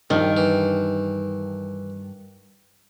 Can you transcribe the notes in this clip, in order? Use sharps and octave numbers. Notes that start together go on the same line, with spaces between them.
A#1 G2 D#3
E3